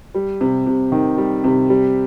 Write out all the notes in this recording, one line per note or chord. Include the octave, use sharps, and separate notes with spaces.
G3
C3
C3
D#3
G3
C3
G3